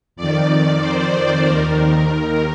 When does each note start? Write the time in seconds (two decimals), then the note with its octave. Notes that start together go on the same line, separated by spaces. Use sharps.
0.16 F2 D#3 D5
0.80 C5
1.43 D#2 D#3 A#4